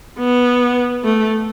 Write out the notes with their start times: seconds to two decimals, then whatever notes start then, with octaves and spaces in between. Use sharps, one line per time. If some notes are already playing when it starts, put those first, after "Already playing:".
0.19 B3
1.04 A3